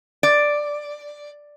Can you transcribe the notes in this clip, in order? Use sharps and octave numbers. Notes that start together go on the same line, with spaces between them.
D5